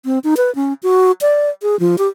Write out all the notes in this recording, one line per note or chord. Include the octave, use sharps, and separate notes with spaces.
C4
D#4
B4
C#4
F#4
D5
G#4
F3
G4